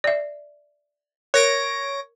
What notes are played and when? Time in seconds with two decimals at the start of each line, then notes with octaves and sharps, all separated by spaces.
0.04 D5 E5
1.34 A#4 C#5 A#6 D7